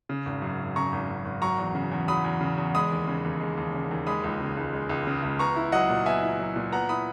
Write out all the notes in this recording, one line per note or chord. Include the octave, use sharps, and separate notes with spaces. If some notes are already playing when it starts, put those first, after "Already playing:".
C#3
G#1
F#2
G#1
C#3 A#5 C#6
G#1
F#2
G#1
F#3 A#5 C#6
E2
C#3
E2
F#3 B5 D#6
E2
C#3
E2
G#3 B5 D#6
D#2
C#3
D#2
G#3
D#2
C#3
D#2
G#3 B5 D#6
C#2
C#3
C#2
G#3
C#2
C#3
C#2
B3 A#5 C#6
E4
F#3 D#5 F#5
A#2
B3 E5 G#5
E4
F#3
A#2
B3 F#5 A#5
E4 B5 D#6